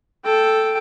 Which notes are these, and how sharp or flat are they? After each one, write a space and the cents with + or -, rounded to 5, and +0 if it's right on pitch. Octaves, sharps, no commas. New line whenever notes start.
A4 +0 G5 +0